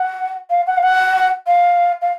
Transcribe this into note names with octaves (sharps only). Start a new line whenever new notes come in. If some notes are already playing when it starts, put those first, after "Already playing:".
Already playing: F#5
F5
F#5
F5
F#5
F5
F5